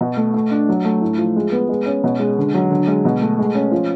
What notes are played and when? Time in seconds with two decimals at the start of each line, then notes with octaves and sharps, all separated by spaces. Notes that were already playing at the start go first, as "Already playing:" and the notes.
0.01 B2
0.17 A3
0.34 A3
0.51 D4
0.69 F#3
0.84 A3
1.01 A2
1.18 F3
1.36 G#3
1.52 B3
1.69 G#3
1.86 C#4
2.04 B2
2.19 G#3
2.38 D3
2.54 F#3
2.70 D3
2.87 G#3
3.05 B2
3.21 A3
3.39 G#3
3.54 C#4
3.71 F3